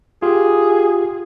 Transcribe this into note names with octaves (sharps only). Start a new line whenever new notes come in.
F4 G4 G#4